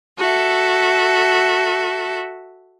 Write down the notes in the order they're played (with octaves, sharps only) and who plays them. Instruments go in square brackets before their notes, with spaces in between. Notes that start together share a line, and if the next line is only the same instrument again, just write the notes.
[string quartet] F#4 A4 E5